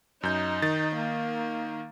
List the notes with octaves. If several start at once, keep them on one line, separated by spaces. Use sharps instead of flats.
F#2 D#4 G6
D#3 A6
A#3